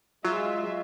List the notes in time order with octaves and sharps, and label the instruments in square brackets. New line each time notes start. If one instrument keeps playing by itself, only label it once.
[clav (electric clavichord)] F#3 [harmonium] G#3 [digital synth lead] F4 [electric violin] E5